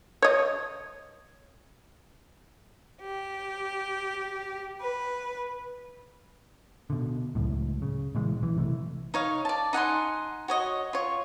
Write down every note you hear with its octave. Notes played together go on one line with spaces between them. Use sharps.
C#5 D#5
G4
B4
B2 D3
C#2 F#2 A2
C#3
A#2 C#3 E3 G#3
B1 E3
C3 E3 G#3 A3
D#4 C#5 F5
D5 A5
D#4 F#5 G#5 C6
F#4 C#5 D#5
F4 C#5